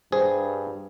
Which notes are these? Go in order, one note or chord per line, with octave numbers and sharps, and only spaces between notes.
G2 G#4 C5